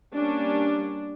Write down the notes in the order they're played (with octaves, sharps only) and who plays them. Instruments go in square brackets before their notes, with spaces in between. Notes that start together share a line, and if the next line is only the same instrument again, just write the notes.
[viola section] G3 A#3 C#4 D4